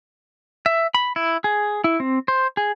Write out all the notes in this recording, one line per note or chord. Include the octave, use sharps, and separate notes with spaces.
E5
B5
E4
G#4
E4
C4
C5
G#4